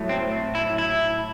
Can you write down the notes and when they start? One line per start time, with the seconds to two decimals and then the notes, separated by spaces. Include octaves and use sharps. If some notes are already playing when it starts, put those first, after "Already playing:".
Already playing: A2 F#3 A3
0.09 C4
0.55 E4
0.78 E4